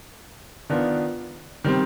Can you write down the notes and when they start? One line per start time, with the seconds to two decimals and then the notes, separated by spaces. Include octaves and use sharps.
0.70 D#3 B3 D4 F4
1.64 D#3 G3 C4